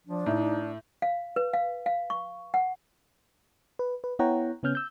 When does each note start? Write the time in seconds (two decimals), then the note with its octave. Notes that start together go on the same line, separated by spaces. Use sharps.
0.07 F3 D4
0.26 A2 D#4
1.02 F5
1.36 B4
1.54 F5
1.86 F5
2.10 C#6
2.54 F#5
3.79 B4
4.04 B4
4.19 B3 E4 C#5 F#5 G5 A#5
4.63 C#3 B3 C#4 F6 G6
4.75 E6 G6